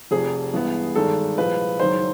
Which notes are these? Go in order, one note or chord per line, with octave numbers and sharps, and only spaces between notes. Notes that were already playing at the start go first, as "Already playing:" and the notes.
F1 F2 C3 G#4
G2 E3 G#3 B3
G#1 G2 D#3 G#3 A4
C2 A#2 F3 G#3 B4
F#1 F#2 D#3 G#3 C5